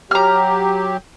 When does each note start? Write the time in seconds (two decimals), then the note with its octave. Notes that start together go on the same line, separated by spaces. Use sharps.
0.11 F#3 G4 A#5 F6